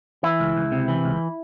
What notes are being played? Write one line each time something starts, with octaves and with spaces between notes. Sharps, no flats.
E3 E4
C#2
C#2
C3
E3
C#2